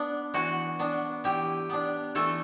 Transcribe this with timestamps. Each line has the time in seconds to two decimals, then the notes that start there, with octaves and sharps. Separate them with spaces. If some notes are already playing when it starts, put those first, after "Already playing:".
Already playing: B3 D4
0.34 E3 F#4
0.79 B3 D4
1.24 E3 G4
1.69 B3 D4
2.15 E3 A3 A4